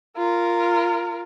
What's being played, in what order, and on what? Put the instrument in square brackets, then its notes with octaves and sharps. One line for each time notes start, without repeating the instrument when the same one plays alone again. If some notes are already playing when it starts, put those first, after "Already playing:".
[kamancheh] F4 A#4